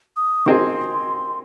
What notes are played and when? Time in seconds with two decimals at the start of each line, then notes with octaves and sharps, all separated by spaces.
0.17 D#6
0.46 D#3 C4 D#4 G#4 D#5 C6